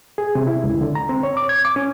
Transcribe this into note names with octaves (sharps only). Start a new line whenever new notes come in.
G#4
C3
E4
C#2
D3
A#5
C4
C#5
D6
G#6
D6
C#4